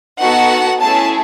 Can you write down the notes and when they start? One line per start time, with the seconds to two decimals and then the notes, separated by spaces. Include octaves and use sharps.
0.20 B3 D#4 F#4 A4 F#5
0.80 A3 C#4 E4 G#4 A5